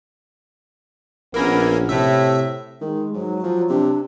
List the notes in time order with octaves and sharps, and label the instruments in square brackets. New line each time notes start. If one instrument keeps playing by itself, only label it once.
[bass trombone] A#1 [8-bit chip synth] A#3 C#4 [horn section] B3 E4 A#4
[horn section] A2 [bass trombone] C3 [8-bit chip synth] E5
[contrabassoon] D#3 [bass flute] G#3
[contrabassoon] G#2 [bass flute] F#3
[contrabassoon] F3
[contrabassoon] C3 [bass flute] D4